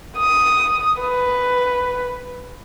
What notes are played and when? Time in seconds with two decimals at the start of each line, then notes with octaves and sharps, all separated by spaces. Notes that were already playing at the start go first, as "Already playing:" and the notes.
0.18 D#6
1.01 B4